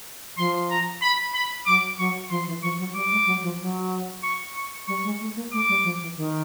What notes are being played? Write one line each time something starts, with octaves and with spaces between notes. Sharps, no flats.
F3 C6
A#5
B5
B5
F#3 D6
F#3 C#6
F3 C6
E3
F3 C#6
F#3
G3 D6
G#3
F#3
F3
F#3
C#6
C#6
G3 C#6
G#3
A3
A#3
A3 D6
G3
F3
E3
D#3